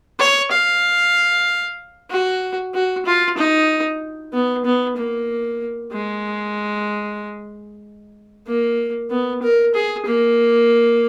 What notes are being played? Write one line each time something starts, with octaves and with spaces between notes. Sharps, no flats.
C#5
F5
F#4
F#4
F4
D#4
B3
B3
A#3
G#3
A#3
B3
A#4
G#4
A#3